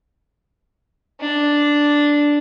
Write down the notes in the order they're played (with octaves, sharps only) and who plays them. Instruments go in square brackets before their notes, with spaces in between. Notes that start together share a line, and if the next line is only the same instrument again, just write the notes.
[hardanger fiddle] D4